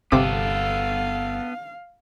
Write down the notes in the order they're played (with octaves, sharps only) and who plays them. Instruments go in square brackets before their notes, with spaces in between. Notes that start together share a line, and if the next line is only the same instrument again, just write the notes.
[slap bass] G1 [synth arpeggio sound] C3 C4 D6 [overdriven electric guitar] B3 A4 [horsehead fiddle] F5